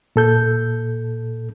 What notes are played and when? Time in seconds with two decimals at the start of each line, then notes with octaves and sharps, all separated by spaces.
0.16 A#2 A4 G6